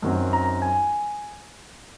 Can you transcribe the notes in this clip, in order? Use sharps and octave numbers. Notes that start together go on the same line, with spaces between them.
F#2 D#3 F#3 C4
A#5
G#5